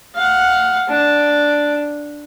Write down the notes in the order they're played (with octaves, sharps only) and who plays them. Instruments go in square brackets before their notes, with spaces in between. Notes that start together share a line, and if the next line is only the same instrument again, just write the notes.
[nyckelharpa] F5 F#5
D4